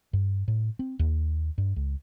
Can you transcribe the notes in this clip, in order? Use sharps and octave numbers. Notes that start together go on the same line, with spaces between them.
G2
A2
C4
D#2
G2
C#2